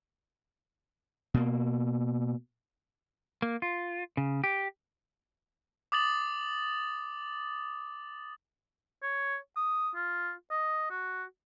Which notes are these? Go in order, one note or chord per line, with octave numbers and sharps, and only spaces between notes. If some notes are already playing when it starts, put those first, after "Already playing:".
B2 A#3
A#3
F4
C#3
G4
D6 D#6 A6 F#7
C#5
D#6
F4
D#5
F#4